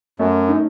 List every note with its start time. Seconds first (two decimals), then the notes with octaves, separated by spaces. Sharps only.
0.19 F#2 A3 C#4
0.48 D#4